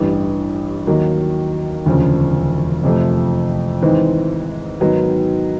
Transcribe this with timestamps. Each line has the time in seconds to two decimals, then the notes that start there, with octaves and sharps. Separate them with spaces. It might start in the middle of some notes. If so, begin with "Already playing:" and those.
Already playing: A1 G2 E3 G3
0.87 D#2 D#3 F#3 A#3
1.86 E1 D2 C#3 F3
2.84 F2 C3 F3 A3
3.82 G#1 G#2 E3 G#3 C4
4.80 G#2 D#3 F#3 B3